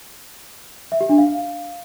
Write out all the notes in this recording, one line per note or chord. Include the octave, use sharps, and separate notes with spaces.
E5
G4
D4
F5